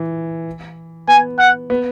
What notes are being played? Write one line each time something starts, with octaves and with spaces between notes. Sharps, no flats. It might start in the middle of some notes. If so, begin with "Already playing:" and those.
Already playing: E3
B3 G#5
F#5
B3